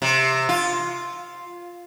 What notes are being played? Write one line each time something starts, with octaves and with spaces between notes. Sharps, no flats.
C3
F4